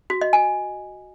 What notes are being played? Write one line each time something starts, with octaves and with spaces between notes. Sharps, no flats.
F#4
D#5
G#5